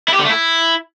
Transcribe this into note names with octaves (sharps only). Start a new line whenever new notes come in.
E4
G4
D3
A3
E4